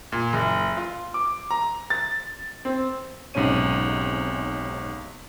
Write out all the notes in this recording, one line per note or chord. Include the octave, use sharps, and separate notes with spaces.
A#2
F#1
F4
D6
A#5
A6
C4
B1 G#2 C3 C#4 C#5 D#7